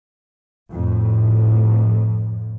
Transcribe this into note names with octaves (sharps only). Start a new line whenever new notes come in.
F2 A2